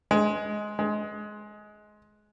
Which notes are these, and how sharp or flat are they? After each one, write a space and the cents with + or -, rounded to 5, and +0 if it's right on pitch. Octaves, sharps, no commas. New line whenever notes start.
G#3 +10
G#3 +15